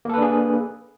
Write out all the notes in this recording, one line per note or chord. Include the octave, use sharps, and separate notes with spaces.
A#3 D4 G#4 A4 B4